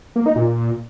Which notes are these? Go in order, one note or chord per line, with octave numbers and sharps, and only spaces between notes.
A#3
D#4
A#2